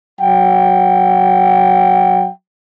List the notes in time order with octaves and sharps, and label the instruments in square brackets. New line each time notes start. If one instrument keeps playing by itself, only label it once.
[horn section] F#3 F#5 G5